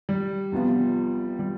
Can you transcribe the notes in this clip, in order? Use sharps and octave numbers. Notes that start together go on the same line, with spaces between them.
G3
E2 C3 F3 B3 F4
G3